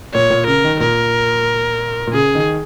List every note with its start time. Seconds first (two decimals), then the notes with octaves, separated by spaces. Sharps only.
0.14 A#2 C#5
0.30 A#2
0.47 C#3 A#4
0.64 D#3
0.80 A#2 A#4
2.07 A#2
2.13 C#3 G#4
2.35 D#3